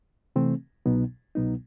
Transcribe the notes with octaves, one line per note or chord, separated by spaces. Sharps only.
C3 E3 A3 C4
C2 B2 F#3 B3 D#4
C2 B2 F#3 B3 D#4